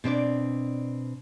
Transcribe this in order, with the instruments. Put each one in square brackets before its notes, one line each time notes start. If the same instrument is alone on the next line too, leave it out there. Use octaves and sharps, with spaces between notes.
[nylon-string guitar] B2 C4 D4 D5